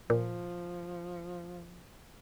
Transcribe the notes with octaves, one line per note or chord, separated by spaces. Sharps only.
A#2 F3